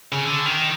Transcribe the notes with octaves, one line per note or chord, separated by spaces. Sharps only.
C#3
D3
D#3